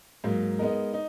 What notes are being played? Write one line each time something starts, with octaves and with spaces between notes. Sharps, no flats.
G#2 F#3 A#3
G#3 B3 D#4 A#4
D#4